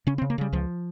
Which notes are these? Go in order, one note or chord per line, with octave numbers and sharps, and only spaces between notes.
C#3 C#4
C4
C#3
A#3
C#3 G3
C#2 F3